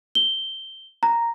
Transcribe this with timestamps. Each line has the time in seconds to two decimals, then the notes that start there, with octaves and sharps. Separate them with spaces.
0.15 G7
1.03 A#5